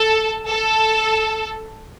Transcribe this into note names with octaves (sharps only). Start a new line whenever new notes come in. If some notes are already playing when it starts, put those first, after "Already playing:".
Already playing: A4
A4